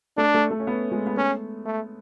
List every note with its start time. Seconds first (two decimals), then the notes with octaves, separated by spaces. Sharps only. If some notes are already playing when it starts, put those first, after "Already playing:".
0.17 A3 D4
0.34 A3
0.50 A3
0.60 C#4
0.67 B3
0.92 G#3
1.07 B3
1.17 A3 C#4
1.65 A3